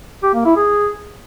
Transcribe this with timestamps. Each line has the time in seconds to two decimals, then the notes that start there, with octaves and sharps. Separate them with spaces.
0.23 G4
0.34 A#3
0.45 E4
0.56 G#4